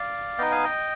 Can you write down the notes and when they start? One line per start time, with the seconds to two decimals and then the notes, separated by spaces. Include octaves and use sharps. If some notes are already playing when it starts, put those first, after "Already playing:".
Already playing: D5 F5
0.38 B3 D#4 D#5 G5
0.51 F5 G#5
0.64 D#5 G5